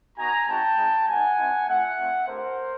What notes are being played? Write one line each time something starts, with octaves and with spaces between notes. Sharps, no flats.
B3 D#4 F#4 G#5 A#5
G#3 C4 D#4 F#4 G5 A5
G#3 C4 D#4
G3 A#3 D#4 F#5 G#5
G3 C4 E4
A3 C4 F4 E5 F#5
A3 C4 F4
A3 D4 G4 A#4 C5